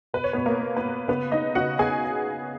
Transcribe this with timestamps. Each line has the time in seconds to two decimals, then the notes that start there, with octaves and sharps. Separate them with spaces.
0.14 B2 B4
0.24 C#5
0.33 B2 B3 B4
0.46 A#3 A#4
0.61 B3
0.77 B3 B4
0.85 B2
1.08 C#3 B3 B4
1.31 B3 D#4 D#5
1.55 C#3 F#4 F#5
1.79 B3 G#4 G#5